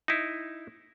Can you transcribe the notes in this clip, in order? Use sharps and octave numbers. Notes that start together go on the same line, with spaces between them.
D#4 E4